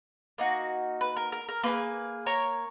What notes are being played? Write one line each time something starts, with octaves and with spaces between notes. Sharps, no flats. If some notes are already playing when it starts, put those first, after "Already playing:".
A#3 D#4 F#4
B4
A#4
A#4
A#4
A#3 E4 G#4 B4
A#4 C#5